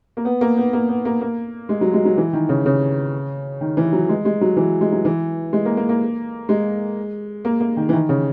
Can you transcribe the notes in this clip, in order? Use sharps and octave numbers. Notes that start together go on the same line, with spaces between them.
A#3
B3
A#3
B3
A#3
B3
A#3
A#3
G#3
F#3
G#3
F#3
E3
D#3
C#3
C#3
D#3
E3
F#3
G#3
G#3
F#3
E3
G#3
F#3
E3
G#3
A#3
A#3
A#3
G#3
A#3
A#3
D#3
E3
D#3
C#3